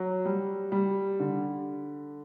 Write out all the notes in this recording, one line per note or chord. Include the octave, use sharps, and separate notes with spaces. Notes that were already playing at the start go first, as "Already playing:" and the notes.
Already playing: F#3
G3
G3
D3